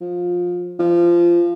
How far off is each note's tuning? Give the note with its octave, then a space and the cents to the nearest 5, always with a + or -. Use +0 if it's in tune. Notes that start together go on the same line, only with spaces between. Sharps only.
F3 +20
F3 -20